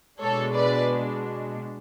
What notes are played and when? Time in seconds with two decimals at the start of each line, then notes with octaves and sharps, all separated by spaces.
0.21 B2 G#3 D4 A4 C#5
0.55 B4 D5